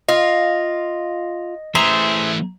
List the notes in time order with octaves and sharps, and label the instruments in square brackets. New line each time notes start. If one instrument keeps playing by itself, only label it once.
[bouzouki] F4 [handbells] D#5
[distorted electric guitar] E3 A3 [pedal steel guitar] G#4 C5 E5 [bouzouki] A#5